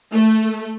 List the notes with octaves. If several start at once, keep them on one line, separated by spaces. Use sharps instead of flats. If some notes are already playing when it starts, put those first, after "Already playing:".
A3